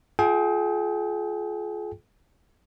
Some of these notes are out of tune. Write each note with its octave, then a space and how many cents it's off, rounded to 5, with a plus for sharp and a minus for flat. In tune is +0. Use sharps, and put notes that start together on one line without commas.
F4 +0 G#4 +35 G5 +0